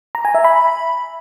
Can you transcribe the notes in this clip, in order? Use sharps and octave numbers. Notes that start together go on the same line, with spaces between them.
A#5
G#5
E5
B5